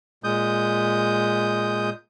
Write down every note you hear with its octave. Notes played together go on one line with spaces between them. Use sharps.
A#2 G#3 D#6 G6